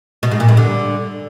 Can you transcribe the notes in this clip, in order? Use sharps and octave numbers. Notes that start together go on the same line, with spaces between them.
B2
G#2
A#2
G2
D3